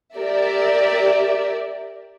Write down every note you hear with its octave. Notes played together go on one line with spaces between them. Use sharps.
G4 A#4 D5 E5